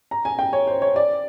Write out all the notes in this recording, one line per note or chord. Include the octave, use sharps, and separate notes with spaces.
A#5
G#5
G5
C#5
C5
C#5
D5